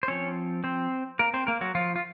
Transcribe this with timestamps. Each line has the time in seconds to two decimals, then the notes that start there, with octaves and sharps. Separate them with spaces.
0.03 C5
0.08 F3 C4 C#4 C#5
0.64 C4 C5
1.19 A#3 A#4
1.34 C4 C5
1.47 A#3 A#4
1.61 F#3 F#4
1.75 F3 F4
1.96 F4